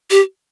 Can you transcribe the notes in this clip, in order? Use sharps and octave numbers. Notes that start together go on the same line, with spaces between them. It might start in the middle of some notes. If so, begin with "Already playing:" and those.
G4